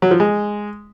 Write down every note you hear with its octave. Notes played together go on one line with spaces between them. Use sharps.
F#3
F3
G#3